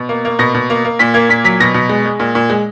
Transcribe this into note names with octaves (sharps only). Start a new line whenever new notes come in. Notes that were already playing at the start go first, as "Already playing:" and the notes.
Already playing: B2
A#3
A#3
B2 A#6
B2
A#3
A#3
A#2 B6
A#3 G#6
A#2 B6
F#3 B6
B2 A#6
B2
G#3
G#3
A#2
A#2
G#3